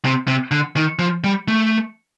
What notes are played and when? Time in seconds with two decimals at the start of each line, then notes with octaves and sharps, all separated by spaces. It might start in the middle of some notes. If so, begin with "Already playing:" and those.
0.05 C3
0.28 C3
0.51 D3
0.76 D#3
0.99 F3
1.24 G3
1.48 A3